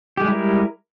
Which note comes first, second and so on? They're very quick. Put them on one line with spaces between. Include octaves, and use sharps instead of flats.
G4 G#3 G3 E4 A#4